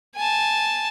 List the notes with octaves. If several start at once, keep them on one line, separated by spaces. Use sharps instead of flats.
G#5 A5